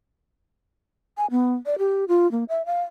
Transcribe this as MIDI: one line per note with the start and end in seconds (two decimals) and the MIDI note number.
1.17 1.26 80
1.31 1.54 59
1.66 1.78 74
1.78 2.05 67
2.08 2.30 65
2.31 2.44 58
2.49 2.65 76
2.66 2.82 77